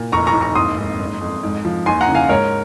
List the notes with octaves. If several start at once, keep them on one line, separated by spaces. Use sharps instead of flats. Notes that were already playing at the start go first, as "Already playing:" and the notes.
Already playing: A#2
F1 A#5 C#6
A#5 C#6
D#2
A#5 C#6
G#1 C6 D#6
G#2
F#1
F2
G#2
F3
D#2 G#5 C6
F#5 A#5
C#3
F5 G#5
G#2 A#4 C#5